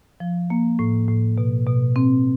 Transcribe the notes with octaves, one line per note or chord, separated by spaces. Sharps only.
F3
A#3
A2
A2
B2
B2
C4